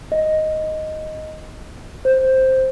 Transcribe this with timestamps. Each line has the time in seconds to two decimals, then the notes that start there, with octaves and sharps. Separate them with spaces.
0.12 D#5
2.05 C5